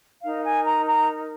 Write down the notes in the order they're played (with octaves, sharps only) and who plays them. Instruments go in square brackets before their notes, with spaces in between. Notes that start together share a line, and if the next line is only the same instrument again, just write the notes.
[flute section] D#4 A#4 F5
G#5
A#5
A#5